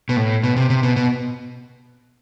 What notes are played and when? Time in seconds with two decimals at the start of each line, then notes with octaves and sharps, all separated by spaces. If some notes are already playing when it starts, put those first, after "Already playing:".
0.09 B2
0.17 A2
0.44 B2
0.56 C3
0.70 C3
0.83 B2
0.96 B2